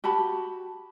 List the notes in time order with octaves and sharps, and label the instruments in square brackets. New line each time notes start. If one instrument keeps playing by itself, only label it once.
[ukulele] F#4 G4 A5 B5